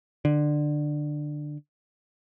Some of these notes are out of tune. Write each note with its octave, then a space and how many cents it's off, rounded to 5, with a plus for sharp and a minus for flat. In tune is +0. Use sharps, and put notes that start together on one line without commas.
D3 +15